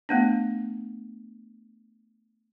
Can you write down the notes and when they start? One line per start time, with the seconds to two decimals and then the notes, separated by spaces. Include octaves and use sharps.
0.09 A3 B3 D4